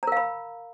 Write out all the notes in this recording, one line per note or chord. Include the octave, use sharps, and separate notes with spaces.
A#4 F5 A#5 B5